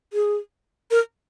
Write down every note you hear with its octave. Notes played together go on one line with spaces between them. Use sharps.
G#4
A#4